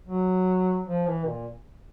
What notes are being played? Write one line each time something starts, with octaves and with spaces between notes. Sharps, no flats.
F#3
F3
E3
A#2